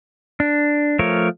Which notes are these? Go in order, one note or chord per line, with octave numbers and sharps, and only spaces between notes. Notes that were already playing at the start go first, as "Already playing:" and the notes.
D4
F3 A3 A#4 C#5